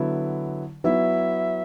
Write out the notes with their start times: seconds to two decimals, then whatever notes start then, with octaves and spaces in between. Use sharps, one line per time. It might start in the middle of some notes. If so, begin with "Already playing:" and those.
Already playing: D3 F#3 B3 E4
0.84 F#3 B3 E4 E5